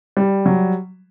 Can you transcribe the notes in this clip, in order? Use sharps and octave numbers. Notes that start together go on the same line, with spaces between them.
G3
F#3